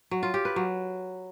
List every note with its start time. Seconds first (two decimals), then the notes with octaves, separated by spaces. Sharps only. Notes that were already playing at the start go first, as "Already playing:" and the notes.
0.11 F#3
0.23 F4
0.34 G4
0.45 B4
0.56 F#3